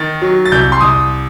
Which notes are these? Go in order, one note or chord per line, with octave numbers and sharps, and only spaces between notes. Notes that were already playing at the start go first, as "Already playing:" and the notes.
Already playing: D#3 A6
F#3
A6
C2 G6
C6
C2 D#6